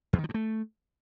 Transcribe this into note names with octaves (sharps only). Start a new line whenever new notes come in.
E2
D#3
F3
G2
A3